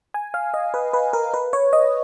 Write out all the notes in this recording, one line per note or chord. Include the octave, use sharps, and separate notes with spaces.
G#5
F5
D#5
B4
B4
A#4
B4
C#5
D#5